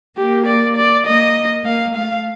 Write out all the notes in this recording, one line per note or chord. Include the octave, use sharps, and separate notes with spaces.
A#3 G4
D5
D5
A#3 D#5
A#3 F5
A3 F5